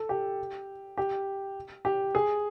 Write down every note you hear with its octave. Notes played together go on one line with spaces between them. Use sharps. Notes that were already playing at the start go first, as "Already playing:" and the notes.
Already playing: A4
G4
G4
G4
G#4